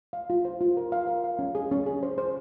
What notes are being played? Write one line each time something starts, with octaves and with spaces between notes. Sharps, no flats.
F5
F4
C5
F4
A#4
F5
A#4
F5
C#4
G#4
C#4
G#4
C5
C5